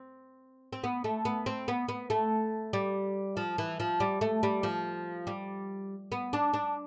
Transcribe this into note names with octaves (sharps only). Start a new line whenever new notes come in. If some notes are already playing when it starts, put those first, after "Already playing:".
Already playing: C4
C4
B3
A3
B3
C4
B3
B3
A3
G3
F3
E3
F3
G3
A3
G3
F3
G3
B3
D4
D4